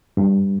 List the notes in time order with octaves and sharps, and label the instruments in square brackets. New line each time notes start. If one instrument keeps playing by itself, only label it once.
[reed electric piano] G2